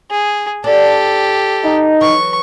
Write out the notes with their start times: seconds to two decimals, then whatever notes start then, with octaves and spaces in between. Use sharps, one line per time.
0.10 G#4
0.64 D4 G4 A4
1.65 D#4
2.01 E3 F#3 C#6